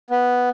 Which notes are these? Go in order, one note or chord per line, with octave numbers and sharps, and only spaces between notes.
B3